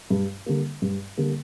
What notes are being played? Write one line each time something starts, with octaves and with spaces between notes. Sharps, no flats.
G2
D3 G3 A#3
G2
D3 G3 A#3